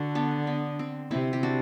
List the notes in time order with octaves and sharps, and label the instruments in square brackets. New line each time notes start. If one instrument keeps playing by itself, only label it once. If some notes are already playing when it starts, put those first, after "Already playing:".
Already playing: [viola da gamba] D3 [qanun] F#4 A4
[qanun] B3 D4
B3
C4
[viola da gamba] C3 [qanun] C4 E4
[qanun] G4
D4 F#4